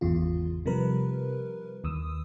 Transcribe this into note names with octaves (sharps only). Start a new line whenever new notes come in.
G#1 E2 C#3 F4
C3 F3 G3 A#4 B4
D#2 D#6 E6